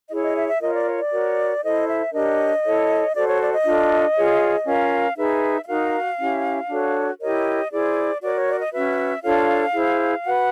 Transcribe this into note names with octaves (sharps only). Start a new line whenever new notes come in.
E4 G#4 C#5 D#5
D#5
E5
E5
F4 A#4 C#5 D#5
D5
C#5
D5
F#4 A#4 C#5
E4 A4 C5 D#5
E5
D4 G4 A#4 C#5 D#5
E4 A4 C#5
F#4 A4 C5 D5
C#5
D5
D#5
D4 F4 A4
F4 G#4 C#5
C#4 F4 A#4 F5
D#4 G#4 B4 E5
E5
D#4 F#4 A#4 F5
C#4 E4 G4
D4 F#4 A4 C#5
E4 G4 A#4 C#5 D#5
E4 G#4 C5 D5
F#4 A#4 C#5 D5
C#5
D5
D#5
C#4 F#4 B4 E5
D4 F4 A4 C#5 F5
E4 G#4 C5
F#4 B4 F#5